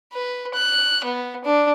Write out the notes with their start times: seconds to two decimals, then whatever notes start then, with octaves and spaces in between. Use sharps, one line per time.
0.13 B4
0.54 F#6
1.04 B3
1.44 D4